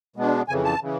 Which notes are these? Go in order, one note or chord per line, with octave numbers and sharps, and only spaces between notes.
B2 G#3 B3 D4
F2 C#3 E3 G#5
A5
C#3 E3